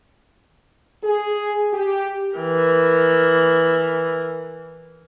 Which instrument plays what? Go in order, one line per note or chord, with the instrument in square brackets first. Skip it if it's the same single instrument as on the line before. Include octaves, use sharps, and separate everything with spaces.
[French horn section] G#4
G4
[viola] E3 A#4